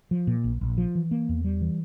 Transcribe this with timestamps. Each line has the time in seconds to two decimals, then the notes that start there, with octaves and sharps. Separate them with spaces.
0.11 F3
0.27 A#2
0.44 A#1
0.61 A#1
0.78 F3
0.95 E3
1.11 A#3
1.29 E2
1.45 G3
1.62 E3